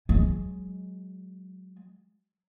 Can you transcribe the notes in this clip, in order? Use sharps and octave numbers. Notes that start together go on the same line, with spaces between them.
F#3 G#3